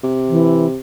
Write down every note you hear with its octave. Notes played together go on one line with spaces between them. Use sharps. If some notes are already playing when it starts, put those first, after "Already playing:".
C3
E3